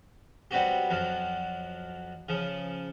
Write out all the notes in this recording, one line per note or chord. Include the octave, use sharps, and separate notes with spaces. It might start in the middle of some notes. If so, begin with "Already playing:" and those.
F#3 G3 B3 C4 F#4 G4
F2 F3 F#3
C#3 F3